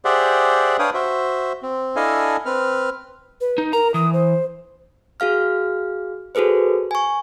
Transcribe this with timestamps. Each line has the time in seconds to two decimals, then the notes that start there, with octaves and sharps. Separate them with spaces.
0.05 G4 G#4 C5 D5 E5 F#5
0.79 D4 B4 C#5 F5 G5 D#6
0.94 F#4 C5 E5
1.63 C4
1.96 D4 E4 A4 D#5 F5 G#5
2.46 C4 B4 F6
3.41 B4
3.58 D#4
3.73 A#4 A#5
3.94 E3 D#6
4.13 C5
5.20 F#4 G#4 F5 F6
6.35 F#4 G#4 A4 B4 C5
6.91 G#5 C#6